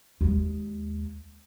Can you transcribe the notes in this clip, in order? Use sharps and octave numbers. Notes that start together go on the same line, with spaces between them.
D#2 G#3